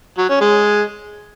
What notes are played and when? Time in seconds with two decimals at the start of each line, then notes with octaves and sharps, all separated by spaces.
0.18 F#3
0.29 C#4
0.41 G#3